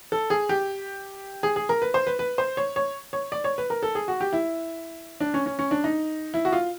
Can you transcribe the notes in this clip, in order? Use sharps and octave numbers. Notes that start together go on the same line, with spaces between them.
A4
G#4
G4
G#4
G#4
A#4
B4
C5
B4
B4
C5
C#5
C#5
C#5
D5
C#5
B4
A#4
A4
G#4
F#4
G4
E4
D4
C#4
C#4
C#4
D4
D#4
E4
F#4
F4